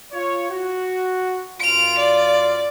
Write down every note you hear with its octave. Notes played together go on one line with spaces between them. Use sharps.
F4 C#5
F#4
F#2 F4 D7 F7
D5